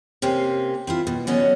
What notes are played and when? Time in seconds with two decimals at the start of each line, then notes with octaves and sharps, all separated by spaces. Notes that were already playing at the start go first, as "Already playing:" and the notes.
0.22 C3 A#3 C4 C#4
0.87 C4 E4 F4
1.07 B2
1.27 D3 F#3 B3 C#4 D5 D#5